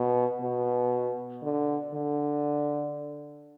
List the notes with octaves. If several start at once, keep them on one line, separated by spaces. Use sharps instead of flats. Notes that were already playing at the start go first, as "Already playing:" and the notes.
Already playing: B2
B2
D3
D3